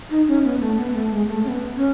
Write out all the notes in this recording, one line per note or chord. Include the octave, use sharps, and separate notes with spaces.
D#4
C#4
B3
A3
B3
A3
G#3
A3
C#4
B3
C#4